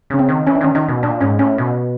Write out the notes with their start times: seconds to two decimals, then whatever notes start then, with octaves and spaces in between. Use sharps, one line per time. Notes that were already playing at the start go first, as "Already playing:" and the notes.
0.10 C#3 C#4
0.19 C4
0.29 D#3
0.47 E3 C#4
0.56 D4
0.61 D#3 C#4
0.75 D#3 D#4
0.88 B2
1.03 A#2 D4
1.21 G#2 C#4
1.39 A2 C#4
1.58 B2